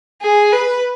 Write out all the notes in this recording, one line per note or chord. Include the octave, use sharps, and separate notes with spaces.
G#4
B4